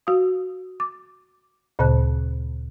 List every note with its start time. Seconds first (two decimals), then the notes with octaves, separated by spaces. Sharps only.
0.07 F#4 F5 D#6
0.80 D6
1.79 D2 A#2 C#3 C5 A5 F#6